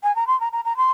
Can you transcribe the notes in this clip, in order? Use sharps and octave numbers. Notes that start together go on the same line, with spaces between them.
G#5
A#5
C6
A#5
A#5
A#5
C6